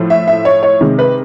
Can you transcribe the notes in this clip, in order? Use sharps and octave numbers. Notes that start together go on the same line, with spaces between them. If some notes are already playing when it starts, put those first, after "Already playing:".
Already playing: A2 F3 A3
E5
E5
C#5
C#5
C3 D#3 G#3
B4